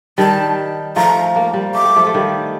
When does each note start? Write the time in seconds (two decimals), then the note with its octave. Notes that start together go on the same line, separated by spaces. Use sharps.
0.18 D#3 G3 A5
0.96 F3 A3 A#5
1.36 A#3
1.53 G3 A#3
1.74 A3 D6
1.85 G3
1.96 F3 A3
2.07 A3
2.14 D#3 G3